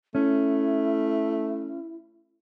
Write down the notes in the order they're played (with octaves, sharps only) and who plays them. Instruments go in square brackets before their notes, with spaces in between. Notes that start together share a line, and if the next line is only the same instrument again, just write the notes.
[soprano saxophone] A3 [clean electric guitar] C#4 [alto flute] E4